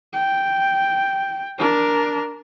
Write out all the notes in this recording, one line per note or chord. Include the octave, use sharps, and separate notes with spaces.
G5
D4 A#4